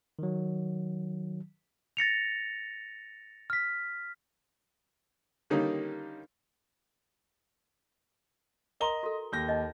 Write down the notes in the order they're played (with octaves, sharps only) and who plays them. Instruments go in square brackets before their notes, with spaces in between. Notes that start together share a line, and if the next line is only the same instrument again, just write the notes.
[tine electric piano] D#3 F#3
[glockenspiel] A6 A#6 C#7 F7
F6 B6
[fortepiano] D3 D#3 G3 A#3 C#4 D#4
[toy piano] A#4 A#5 C6 [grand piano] D#5 G7
[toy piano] F#4 A4
[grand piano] D#2 G6 A#6
[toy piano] D#4 D#5